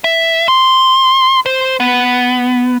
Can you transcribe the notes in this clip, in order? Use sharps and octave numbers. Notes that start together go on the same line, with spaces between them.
E5
C6
C5
B3